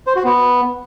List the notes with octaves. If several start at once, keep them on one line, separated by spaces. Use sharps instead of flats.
C5
F#4
B3